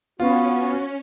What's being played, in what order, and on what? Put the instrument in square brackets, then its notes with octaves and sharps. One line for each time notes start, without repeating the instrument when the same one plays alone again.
[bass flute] B3 [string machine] C#4 [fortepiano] F4 [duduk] F#4